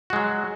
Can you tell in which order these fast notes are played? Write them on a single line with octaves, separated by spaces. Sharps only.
F#4 G#3 F#3